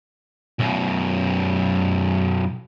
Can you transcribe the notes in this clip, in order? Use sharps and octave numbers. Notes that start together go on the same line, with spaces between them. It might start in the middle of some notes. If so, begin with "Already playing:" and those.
B1 F#2